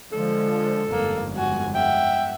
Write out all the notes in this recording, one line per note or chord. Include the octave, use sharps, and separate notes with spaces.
D3 F3 G#3 A4
G1 F2 G#2 A#3
F#4 G#5
E5 F#5 G5